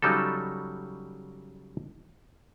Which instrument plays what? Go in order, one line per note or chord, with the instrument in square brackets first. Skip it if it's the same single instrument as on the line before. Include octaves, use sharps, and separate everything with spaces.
[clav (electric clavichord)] C#3 F#3 G3 D#4 A4